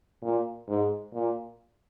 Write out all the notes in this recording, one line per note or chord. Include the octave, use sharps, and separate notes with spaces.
A#2
G#2
A#2